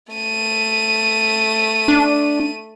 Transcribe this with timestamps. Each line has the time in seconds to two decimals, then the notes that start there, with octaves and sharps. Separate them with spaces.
0.13 A3 D#7
1.88 D4